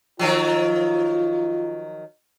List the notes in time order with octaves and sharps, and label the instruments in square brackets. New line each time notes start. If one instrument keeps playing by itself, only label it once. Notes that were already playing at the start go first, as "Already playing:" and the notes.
[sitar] D#3 F3 F#3 [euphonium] F4